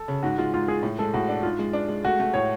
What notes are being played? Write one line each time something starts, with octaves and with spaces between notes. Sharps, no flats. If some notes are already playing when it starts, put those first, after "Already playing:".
Already playing: A4
C#3
G#2 F#4
G#3 F4
G#2 F4
G#3 G#4
A2
G#3 A4
A2 F#4
D4
G#2 F4
G#3
D4
G#3
A3 F#4
A3
A2 C#5